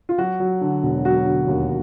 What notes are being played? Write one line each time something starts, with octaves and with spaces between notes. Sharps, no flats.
F4
F#3 F#4
F#3
D3
E1
F#3 F#4
D3
D#2